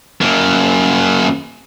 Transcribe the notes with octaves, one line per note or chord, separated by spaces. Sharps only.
F#2 A#3